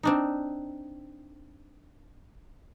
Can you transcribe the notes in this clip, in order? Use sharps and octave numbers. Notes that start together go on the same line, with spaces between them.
C4 D4 D#4